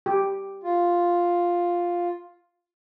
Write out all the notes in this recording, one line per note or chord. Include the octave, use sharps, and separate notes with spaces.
G4
F4